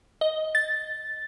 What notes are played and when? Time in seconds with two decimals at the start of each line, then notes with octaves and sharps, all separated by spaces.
0.21 D#5
0.55 A6